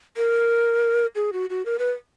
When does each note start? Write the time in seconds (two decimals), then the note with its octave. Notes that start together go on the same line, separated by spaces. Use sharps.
0.17 A#4
1.16 G#4
1.33 F#4
1.50 F#4
1.66 A#4
1.79 B4